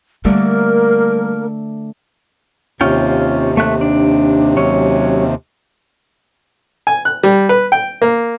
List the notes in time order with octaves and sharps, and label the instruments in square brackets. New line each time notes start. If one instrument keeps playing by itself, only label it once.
[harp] D3 A3 D4 [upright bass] G3 [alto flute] A#3 [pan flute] A#4
[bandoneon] D#2 C3 [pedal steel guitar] C#4 F4 G5
[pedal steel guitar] A3 E5 F#6
D4
F#3 C#4
[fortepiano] G#5
F#6
G3
B4
G5
A#3